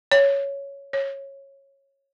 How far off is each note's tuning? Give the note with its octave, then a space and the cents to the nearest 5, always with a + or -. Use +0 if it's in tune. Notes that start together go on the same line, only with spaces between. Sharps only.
C#5 +5
C#5 -15